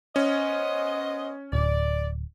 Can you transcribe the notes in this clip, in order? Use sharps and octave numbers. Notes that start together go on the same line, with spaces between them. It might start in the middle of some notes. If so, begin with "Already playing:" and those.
B3 C#4 C5 D#5
D1 D5